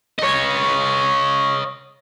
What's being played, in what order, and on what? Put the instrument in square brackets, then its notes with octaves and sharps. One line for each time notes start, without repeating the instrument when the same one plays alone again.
[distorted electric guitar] C#5 D#5